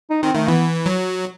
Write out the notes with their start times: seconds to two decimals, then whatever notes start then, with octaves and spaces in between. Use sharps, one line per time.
0.10 D#4
0.22 D#3 C4
0.35 D#3 A3
0.48 E3 B3
0.86 F#3